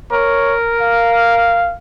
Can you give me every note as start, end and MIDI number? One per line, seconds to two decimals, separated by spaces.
0.12 1.71 70
0.12 0.55 73
0.81 1.75 77